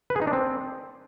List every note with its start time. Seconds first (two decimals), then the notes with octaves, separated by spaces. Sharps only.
0.10 B4
0.16 G#4
0.22 D#4
0.27 D4
0.33 C4